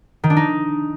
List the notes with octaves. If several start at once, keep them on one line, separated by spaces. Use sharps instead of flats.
D#3
D4
D#4